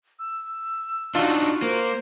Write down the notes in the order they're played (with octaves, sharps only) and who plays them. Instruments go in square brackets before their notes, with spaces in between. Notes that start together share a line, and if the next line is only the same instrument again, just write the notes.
[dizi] E6
[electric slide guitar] D4 D#4 [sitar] F4 F#4
[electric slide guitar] A#3 [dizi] C5